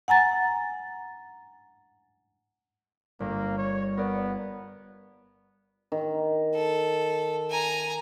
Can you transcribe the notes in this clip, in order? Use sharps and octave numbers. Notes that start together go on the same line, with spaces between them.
F#5 G#5 A#5 A6
G1 A#3
C#5
B3 A#4 D5
D#3
A4
G#5 A#5